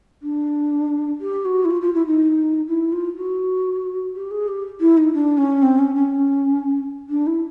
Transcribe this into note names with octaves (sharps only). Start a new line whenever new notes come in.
D4
G4
F#4
E4
F4
F4
E4
D#4
E4
F4
F#4
G4
G#4
G4
E4
D#4
D4
C#4
C4
C#4
C#4
D4
E4